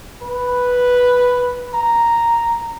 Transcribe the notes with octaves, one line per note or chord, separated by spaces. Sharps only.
B4
A#5